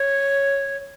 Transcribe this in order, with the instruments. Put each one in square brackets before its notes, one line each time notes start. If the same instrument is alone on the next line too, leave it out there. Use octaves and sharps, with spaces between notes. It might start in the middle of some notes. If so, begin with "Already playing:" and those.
Already playing: [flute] C#5